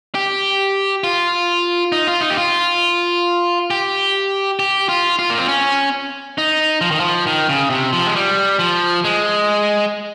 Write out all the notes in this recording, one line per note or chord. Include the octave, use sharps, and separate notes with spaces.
G4
F4
D#4
F4
D#4
G4
F4
G4
G4
F4
F4
A#3
C4
C#4
D#4
F3
D#3
F3
D#3
C#3
C3
F3
G#3
G3
F3
G#3